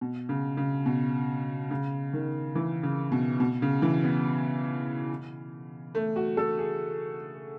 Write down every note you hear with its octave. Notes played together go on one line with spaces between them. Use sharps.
B2
C#3
C#3
B2
C#3
D#3
E3
C#3
B2
B2
C#3
E3
B3
A3
F#4
A4
G#4